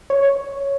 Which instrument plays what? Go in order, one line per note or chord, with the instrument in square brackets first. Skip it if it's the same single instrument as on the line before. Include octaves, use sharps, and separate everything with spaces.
[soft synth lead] C#5